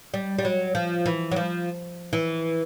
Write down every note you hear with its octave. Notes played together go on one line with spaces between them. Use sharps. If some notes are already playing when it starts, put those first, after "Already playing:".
G3
G3
F#3
F3
E3
F#3
F3
E3